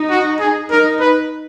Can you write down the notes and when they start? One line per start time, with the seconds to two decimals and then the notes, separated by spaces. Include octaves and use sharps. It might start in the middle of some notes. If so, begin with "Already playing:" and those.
Already playing: D#4
0.10 F#4
0.40 G#4
0.70 D#4 A#4
1.00 B4